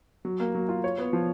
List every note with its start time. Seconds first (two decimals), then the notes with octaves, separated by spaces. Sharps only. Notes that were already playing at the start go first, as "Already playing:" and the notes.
0.25 F#3
0.40 A#3
0.55 F#3
0.69 F4
0.84 C#5
0.98 B3
1.13 F3